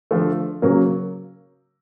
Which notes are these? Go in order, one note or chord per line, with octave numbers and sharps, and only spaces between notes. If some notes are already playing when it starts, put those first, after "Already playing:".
D3 F3 A3
C#3 F#3 A#3